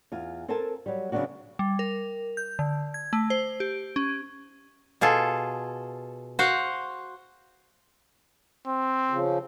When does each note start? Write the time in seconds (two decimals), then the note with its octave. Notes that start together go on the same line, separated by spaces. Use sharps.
0.12 E2 F4 G#5
0.48 C4 A4 A#4 C5 G#5 A5
0.86 F#3 G3
1.12 C#3 F#3 G#3 B3 D4 F#4
1.59 G3
1.79 A#4
2.37 G6
2.59 D3
2.94 G#6
3.13 A3
3.30 C5
3.60 G4
3.96 C#4
5.01 B2 F4 G#4 A4
6.39 F#4 C5 F5 F#5
8.67 C4
9.10 C#3 F3